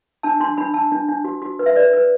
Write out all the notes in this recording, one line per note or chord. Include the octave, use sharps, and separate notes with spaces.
D4 A5
D4 C6
D4 B5
D4 A5
D4
D4
F#4
F#4
B4
E5
B4 D5
B4